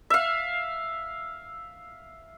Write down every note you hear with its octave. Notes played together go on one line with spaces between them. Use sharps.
E5 F5